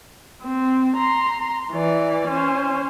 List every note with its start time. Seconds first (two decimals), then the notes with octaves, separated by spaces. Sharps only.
0.42 C4
0.95 A#5 C6
1.72 E3 D5
2.28 C#4 C5